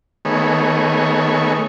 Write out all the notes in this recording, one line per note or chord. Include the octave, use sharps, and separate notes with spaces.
D#3 A3 B3 G#4 C#5